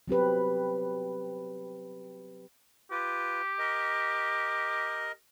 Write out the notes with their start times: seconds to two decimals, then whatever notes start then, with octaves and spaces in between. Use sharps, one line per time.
0.08 F#3 C4 G4 B4
2.91 F4 G4 B4
3.59 A#4 D#5